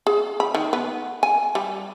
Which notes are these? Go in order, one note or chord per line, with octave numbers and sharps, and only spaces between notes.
G#4
B5
D#3
B3
G#5
G3